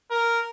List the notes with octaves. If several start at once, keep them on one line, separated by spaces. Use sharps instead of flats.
A#4